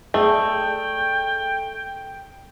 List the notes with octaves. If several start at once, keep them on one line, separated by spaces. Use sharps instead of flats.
A3 G#4 D5 D#5 G5